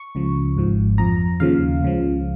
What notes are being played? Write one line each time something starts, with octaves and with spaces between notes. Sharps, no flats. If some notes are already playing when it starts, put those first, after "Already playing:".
Already playing: C#6
C#2 C#3 F3
G#1 G#2 F3
F2 F3 A#5
D#2 C#3 F3 F5
C#2 C#3 F3